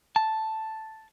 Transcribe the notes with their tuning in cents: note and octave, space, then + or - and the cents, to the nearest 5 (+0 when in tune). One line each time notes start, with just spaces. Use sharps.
A5 +0